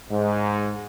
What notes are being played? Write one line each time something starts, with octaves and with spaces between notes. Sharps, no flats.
G#2